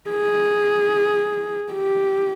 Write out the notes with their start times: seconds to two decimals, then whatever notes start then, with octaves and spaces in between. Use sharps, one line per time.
0.10 G#4
1.73 G4